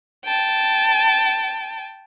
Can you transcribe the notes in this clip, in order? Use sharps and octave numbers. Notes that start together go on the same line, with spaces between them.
G5 A5